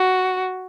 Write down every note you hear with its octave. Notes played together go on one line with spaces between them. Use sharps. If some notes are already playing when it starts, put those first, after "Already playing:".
Already playing: F#4